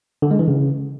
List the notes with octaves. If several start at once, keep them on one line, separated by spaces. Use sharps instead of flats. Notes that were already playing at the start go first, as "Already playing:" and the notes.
D3
G#3
E3
C#3